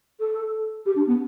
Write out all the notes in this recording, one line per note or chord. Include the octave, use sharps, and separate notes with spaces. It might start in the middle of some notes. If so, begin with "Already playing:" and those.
A4
G4
D4
B3